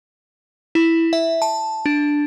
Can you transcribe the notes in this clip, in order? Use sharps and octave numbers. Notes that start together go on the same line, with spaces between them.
E4
E5
A5
D4